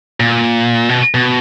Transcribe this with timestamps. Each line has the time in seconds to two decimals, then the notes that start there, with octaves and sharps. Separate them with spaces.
0.20 A#2
0.89 B2
1.14 B2